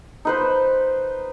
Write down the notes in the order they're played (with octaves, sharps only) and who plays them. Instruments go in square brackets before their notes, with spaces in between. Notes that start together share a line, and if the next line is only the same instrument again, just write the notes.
[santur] D#4 B4 C5